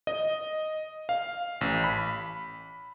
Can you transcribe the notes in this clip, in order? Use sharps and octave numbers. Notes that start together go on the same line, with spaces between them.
D#5
F5
A1
B5